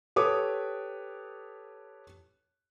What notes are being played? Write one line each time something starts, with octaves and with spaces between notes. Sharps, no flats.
G4 A4 B4 C#5 D6 D#6